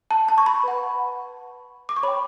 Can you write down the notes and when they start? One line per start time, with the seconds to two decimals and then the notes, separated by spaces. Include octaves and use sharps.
0.11 A5
0.28 A5
0.38 C#6
0.46 B5
0.64 B4 F#5
1.89 D6
1.96 C#6
2.03 C#5 B5
2.08 G5